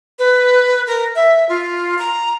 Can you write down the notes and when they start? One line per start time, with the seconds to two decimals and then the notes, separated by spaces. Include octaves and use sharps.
0.19 B4
0.87 A#4
1.15 E5
1.49 F4
1.99 A#5